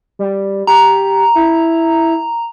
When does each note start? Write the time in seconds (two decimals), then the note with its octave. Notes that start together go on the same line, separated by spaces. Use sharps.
0.19 G3
0.67 G4 A#5
1.35 E4